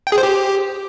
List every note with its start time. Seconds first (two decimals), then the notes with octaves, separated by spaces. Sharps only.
0.07 G5
0.12 G#4
0.18 C5
0.23 G4